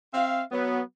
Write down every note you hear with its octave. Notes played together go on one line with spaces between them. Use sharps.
C4 E5 F5
F#3 B3